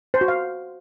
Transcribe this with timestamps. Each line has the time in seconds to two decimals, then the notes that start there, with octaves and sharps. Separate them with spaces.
0.14 C5
0.21 F#4
0.28 F5